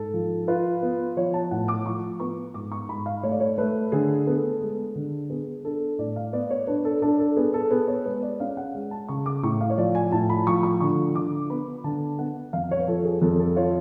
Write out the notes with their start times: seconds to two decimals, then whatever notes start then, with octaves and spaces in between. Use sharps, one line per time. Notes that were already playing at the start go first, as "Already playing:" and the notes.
Already playing: G#2 A4
0.14 F3
0.48 F4 B4
0.82 B3
1.17 F3 C#5
1.34 A5
1.51 A2 F#5
1.68 D6
1.85 F3 C#6
2.20 B3 C#6
2.54 G#2 D6
2.72 C#6
2.89 G#2 B5
3.06 F5
3.23 A3 C#5
3.32 D5
3.40 C#5
3.58 A3 B4
3.92 D3 G#4
4.27 B3 A4
4.61 G#3
4.95 D3
5.30 B3 G#4
5.64 D4 A4
5.99 A2 D5
6.16 F5
6.33 B3 D5
6.50 C#5
6.67 D4 B4
6.85 A4
7.02 D4 A4
7.20 A4
7.37 B3 G#4
7.54 A4
7.71 B3 G#4
7.88 C#5
8.05 G#3 B4
8.22 D5
8.40 C#4 F5
8.57 F#5
8.75 G#3
8.91 A5
9.09 C#3 C#6
9.26 D6
9.43 A2 C#6
9.61 F5
9.70 C#5
9.78 F3 D5
9.95 G#5
10.12 A2 A5
10.29 B5
10.47 F3 C#6
10.63 C#6
10.81 D3 C#6
11.15 D3 D6
11.50 B3 B5
11.84 D3 A5
12.19 B3 F#5
12.53 F2 F5
12.71 C#5
12.80 B4
12.88 F3 A4
13.05 G#4
13.22 F2 A4
13.39 A4
13.56 F4 C#5